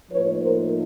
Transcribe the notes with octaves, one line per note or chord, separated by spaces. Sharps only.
A2 F3 A#3 D#4 B4 C#5
A#4 C5